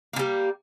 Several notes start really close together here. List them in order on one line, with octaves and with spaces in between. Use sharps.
A#3 D3 G3